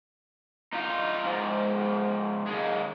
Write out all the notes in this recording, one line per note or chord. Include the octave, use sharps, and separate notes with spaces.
D#4 F4
G#2 F3
D#2 G#3